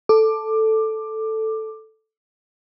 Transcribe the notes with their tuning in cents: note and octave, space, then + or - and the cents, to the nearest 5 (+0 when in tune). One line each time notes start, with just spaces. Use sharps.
A4 +0 D6 +15